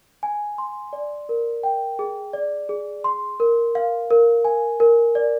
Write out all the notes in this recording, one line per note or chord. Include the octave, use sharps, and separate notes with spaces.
G#5
C6
D5
A#4
G5
G#4
D5
G#4
C6
A#4
F5
A#4
G#5
A#4
D5